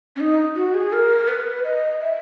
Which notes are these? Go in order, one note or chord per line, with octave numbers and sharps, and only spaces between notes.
C#4
D#4
F#4
G#4
A#4
B4
D#5
E5